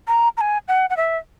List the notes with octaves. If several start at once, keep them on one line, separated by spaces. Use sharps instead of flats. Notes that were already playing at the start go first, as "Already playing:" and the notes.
A#5
A#5
G#5
F#5
F#5
E5